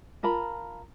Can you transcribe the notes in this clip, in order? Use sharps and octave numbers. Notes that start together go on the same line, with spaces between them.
F4 A#4 A5 B5